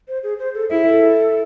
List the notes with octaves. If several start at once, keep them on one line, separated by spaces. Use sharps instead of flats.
C5
G#4
C5
A4
E4 G#4
A4